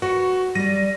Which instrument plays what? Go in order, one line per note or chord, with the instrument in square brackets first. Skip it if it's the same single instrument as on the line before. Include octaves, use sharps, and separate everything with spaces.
[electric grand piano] F#4 [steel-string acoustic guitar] B4 C#5
[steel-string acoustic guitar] G3 D5 [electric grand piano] A#6 D#7